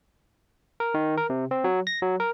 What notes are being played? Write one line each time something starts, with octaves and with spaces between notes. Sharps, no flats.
A#4
D#3
A#4
C3
C4
F#3
A#6
F#3
A#4